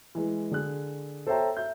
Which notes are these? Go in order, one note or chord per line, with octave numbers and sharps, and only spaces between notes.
E3 G#3
D3 G#4 F#6
A4 C5 C#5 E5 G5 A#5
E5 G6